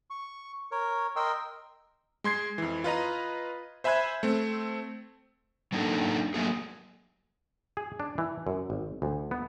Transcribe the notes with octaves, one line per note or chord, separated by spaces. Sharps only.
C#6
A#4 C#5
A#4 D#5 G5 C6 E6
G#3 C6 G#6 C7
F2 E3
F4 B4 D#5 A#5
C5 E5 G#5 B5 F#6 G#6
A3 C4
F#3 A#3 D4 D#4 F#4 A4
F#3 A3 A#3 G#4
G#4
D4
E3
F#2
G#1
D2
B3